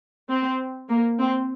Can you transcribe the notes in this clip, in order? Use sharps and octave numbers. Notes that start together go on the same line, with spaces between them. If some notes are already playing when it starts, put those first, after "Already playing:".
C4
A#3
C4